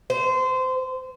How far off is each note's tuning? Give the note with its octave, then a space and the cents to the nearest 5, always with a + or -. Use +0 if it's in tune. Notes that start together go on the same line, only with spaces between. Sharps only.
C5 -25